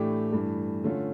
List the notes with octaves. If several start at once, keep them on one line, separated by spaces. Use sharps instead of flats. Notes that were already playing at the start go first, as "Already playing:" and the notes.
Already playing: A2 E3 A3 D4 G4
G2 E3 A3
D3 A3 C#4 F4